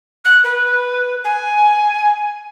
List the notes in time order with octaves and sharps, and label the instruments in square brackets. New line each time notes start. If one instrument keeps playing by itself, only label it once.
[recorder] F#6
B4
G#5